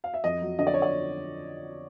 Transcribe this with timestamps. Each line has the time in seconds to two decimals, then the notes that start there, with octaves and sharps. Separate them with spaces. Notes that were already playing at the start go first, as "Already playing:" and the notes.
0.04 F5
0.14 E5
0.24 F2 D#5
0.42 F#3
0.59 D3 D#5
0.67 D5
0.74 C#5
0.82 D5